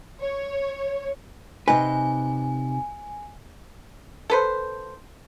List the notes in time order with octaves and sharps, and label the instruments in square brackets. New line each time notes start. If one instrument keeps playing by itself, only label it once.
[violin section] C#5
[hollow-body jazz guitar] C3 D#4 B4 [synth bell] G#5
[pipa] A4 B4 C5